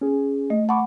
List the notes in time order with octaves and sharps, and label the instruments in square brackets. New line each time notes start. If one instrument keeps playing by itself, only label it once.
[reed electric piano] C#4 G#4
[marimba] A3 [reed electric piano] D#5
[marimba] F#5 B5 [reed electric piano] A5 C#6 D6